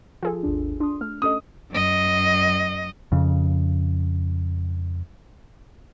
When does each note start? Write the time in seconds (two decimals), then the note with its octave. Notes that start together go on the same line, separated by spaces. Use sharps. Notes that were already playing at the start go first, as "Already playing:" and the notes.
0.23 F3 F4 G#4 A4
0.43 G#1 D#2 D4
0.80 D4 C6 D#6
1.01 A3 F6
1.22 C#4 A4 D#5 D#6
1.71 F#2 D#5
3.12 F2 C#3